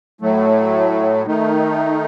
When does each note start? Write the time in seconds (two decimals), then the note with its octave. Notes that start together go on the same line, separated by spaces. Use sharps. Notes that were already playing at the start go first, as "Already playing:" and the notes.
0.21 A2 F#3 A3
1.26 D#3 A3 D#4